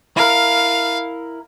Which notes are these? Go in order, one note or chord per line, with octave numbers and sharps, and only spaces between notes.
E4 A#4 F5